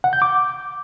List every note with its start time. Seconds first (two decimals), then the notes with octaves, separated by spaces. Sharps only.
0.04 F#5
0.13 G6
0.22 D6